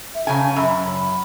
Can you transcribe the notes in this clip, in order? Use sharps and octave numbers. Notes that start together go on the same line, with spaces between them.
E5
C#3 C#4 G#5
F#2 B5